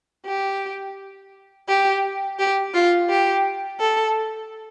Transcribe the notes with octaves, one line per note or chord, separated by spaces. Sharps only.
G4
G4
G4
F4
G4
A4